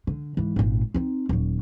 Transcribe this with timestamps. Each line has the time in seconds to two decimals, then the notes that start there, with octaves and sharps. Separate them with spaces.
0.07 D3
0.37 G#2 E3
0.56 G#1 A#2
0.94 C4 D#4
1.29 D#1 F#3